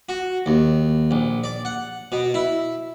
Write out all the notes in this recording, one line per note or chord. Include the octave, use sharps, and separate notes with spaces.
F#4
D#2
A#1
D5
F#5
B2
E4